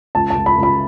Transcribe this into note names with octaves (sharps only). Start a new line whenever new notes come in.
C#2 A5
A5
C#2
B5
C#2
B5